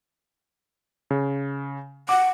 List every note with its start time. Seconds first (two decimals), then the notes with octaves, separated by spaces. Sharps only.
1.11 C#3
2.09 F#5 D6